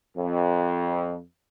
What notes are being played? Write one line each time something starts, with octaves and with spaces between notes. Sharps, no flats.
F2